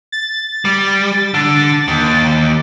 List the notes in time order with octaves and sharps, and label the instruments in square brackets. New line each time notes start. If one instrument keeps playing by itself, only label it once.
[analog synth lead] A6
[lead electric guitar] G3
D3
D#2